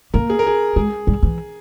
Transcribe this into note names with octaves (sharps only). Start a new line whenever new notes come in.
A#3 A#4
G#4
A#4
G#4
G#3 G#4
G3
E3